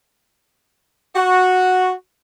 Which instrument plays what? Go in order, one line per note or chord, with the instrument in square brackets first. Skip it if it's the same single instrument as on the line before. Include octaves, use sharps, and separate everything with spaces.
[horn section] F#4